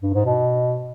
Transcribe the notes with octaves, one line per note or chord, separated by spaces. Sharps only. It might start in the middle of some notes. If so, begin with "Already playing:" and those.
G2
G#2
B2